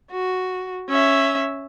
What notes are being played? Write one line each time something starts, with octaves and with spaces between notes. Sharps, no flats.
F#4
C#4 E5